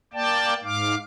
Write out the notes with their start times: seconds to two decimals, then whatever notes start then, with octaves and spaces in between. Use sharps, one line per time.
0.13 A#3 D5 G5 A5
0.64 G#2 F5 D6